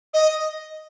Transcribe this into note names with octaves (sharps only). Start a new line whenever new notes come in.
D#5